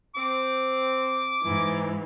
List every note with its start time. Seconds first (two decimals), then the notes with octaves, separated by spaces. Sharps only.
0.15 C4 D6
1.42 G#2 E3